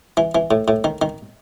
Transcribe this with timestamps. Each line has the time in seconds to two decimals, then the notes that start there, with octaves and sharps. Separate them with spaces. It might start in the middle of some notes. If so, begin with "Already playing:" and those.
0.17 E3
0.35 E3
0.51 A2
0.68 A2
0.84 D#3
1.02 D#3